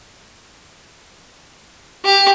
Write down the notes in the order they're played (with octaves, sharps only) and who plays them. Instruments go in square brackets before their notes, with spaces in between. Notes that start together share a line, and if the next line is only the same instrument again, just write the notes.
[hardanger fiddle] G4